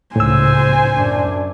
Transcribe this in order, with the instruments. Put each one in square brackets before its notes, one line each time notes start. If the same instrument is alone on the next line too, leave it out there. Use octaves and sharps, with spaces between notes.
[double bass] C#2 C#3 [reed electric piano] A2 E6 [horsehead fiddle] C5 G#5
[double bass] F#2 D4